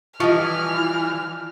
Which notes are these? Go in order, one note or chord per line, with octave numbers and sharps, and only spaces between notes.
E3 F3 G3 F4 D#5 F6